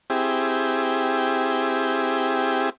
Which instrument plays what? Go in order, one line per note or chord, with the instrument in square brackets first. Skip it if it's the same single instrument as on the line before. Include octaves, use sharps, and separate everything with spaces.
[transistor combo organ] C4 E4 G4 G#4